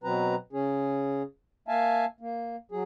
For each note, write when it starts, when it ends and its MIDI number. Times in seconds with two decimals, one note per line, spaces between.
0.04 0.35 47
0.04 0.35 54
0.04 0.35 60
0.04 0.35 71
0.04 0.35 82
0.53 1.22 49
0.53 1.22 61
0.53 1.22 68
1.68 2.05 58
1.68 2.05 76
1.68 2.05 77
1.68 2.05 80
1.68 2.05 81
2.20 2.56 58
2.72 2.83 54
2.72 2.83 68